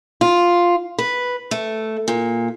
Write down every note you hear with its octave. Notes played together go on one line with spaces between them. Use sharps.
F4
B4
A3
A#2